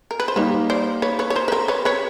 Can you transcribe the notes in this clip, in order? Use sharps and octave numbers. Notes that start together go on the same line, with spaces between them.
A#4
B4
C5
G3 A#3 D#4 B4 C#5
C5 D5
B4 C#5
B4 C#5
C#5
A#4 C5
B4
A#4 C5
B4 C#5
B4 C#5